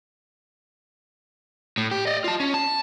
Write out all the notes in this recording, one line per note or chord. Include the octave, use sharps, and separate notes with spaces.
A2
G4
D5 D#5
F4 A5
C#4
A5